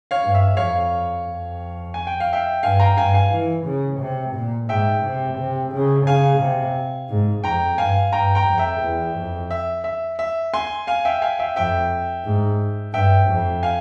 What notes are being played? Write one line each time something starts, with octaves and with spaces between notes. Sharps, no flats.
C#5 F5
G2
E5
F2 C#5 F5
F2
G#5
G5
F5
E5 G5
G2 F5 G#5
G5 A#5
G2 F5 G#5
F5 G#5
E3
C#3
C3
A#2
G#2 E5 G5
C3
C3
C#3
C#3 F5 G#5
C3
G#2
F2 G5 A#5
G2 F5 G#5
G2 G5 A#5
G5 A#5
F2
E5 G5
E2
F2
E5
E5
E5
G#5 C6
F5 G#5
E5 G5
F5 G#5
E5 G5
F2 E5 G5
G#2
G2 E5 G5
F2
F5 G#5